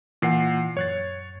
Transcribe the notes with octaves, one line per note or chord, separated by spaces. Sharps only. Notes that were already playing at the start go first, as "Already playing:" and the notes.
A#2 E3 F#5 C7
F#2 C#5 F#6 A6